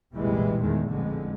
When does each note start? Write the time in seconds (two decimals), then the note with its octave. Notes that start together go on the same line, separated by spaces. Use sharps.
0.14 F1 B1 A#2 E3 G3 G#3
0.60 E2 D#3 G#3 A3
0.89 A1 F2 D3 G#3